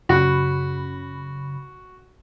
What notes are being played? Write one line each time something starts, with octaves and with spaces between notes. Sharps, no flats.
F#2 C#3 F#4 B5